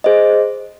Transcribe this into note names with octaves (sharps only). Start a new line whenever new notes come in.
G#4 C5 D#5